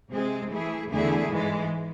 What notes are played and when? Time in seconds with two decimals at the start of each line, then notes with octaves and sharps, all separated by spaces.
0.11 C3 G#3 C4 G#4
0.50 E3 A3 E4 G#4
0.90 E2 D3 A3 E4 G#4
1.30 G#2 E3 G#3